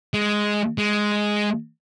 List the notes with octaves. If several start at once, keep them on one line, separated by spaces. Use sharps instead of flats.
G#3
G#3